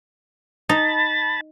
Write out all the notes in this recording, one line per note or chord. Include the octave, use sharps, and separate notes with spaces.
D#4 A5 B5 A6